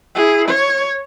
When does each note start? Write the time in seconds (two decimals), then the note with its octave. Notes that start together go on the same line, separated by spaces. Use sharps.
0.15 E4 G#4
0.48 C#5